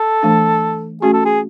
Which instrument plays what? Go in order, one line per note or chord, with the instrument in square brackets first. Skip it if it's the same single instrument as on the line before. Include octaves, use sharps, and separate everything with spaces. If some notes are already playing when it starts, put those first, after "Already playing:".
Already playing: [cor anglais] A4
[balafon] E3 A3 D4
[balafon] A3 C#4 F#4 [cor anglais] G#4
[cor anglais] A4
G#4